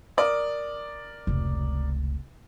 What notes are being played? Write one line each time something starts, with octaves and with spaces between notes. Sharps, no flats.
A#4 D5 D#6
F1 C#2